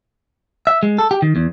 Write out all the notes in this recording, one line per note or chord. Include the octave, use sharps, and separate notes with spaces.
E5
G#3
A4
G4
D#3
E2